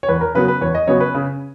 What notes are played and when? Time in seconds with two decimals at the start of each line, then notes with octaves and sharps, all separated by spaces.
0.03 C#5
0.08 E2 B4
0.21 A#4
0.35 C#3 F#3 B3 B4
0.48 B4
0.61 E2 C#5
0.75 D#5
0.87 C#3 F#3 B3 C#5
1.00 B4
1.14 C#3